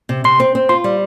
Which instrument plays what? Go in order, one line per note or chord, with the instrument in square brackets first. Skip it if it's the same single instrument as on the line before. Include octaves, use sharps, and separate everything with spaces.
[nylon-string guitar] C3
[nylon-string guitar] C3 [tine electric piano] C6
[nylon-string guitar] C4
C4
[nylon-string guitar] F4 [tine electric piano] C6
[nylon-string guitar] G3